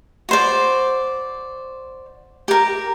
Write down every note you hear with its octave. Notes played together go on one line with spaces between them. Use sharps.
F#4 C5 D5
G4 A#4